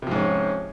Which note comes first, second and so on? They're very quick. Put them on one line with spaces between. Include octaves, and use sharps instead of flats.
C3 F3 G#2 C#4